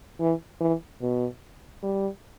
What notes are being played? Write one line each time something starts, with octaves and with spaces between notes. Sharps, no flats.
E3
E3
B2
G3